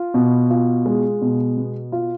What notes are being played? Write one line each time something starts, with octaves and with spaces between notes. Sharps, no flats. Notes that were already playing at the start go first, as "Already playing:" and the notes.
Already playing: F4
B2
F4
G#3
B2
B3
F4